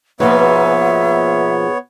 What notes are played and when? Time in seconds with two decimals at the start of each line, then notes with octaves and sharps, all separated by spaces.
0.20 G#2 B2 F3 A#3 B3 B4 C#5 E5